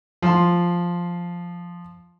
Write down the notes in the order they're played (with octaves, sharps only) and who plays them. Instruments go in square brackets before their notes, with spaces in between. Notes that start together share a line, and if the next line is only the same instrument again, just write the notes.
[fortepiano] F3 C6